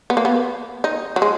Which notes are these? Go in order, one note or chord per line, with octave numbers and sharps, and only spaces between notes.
B3
A#3
B3
D#4
F#3
G#3